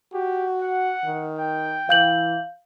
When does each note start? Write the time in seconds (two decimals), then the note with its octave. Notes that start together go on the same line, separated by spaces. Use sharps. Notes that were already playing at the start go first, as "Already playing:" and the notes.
0.14 F#4 G4
0.61 F#5
1.05 D#3
1.39 G5
1.89 E3 F5 G6 F#7